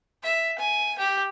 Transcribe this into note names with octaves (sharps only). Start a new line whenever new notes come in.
E5
G#5
G4